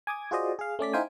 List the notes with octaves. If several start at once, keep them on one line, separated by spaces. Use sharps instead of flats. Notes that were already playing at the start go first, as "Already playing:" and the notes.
G#5 D6 D#6 G#6
F4 F#4 G#4 C5 D5 D#5
G#4 F5
A3 C#4 D5 B6
D#4 E4 C5 F5 G5 G#5